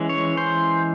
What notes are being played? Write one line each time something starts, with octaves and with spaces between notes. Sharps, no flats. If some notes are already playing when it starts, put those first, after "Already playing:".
Already playing: E3 G#3 C#4
C#5
C5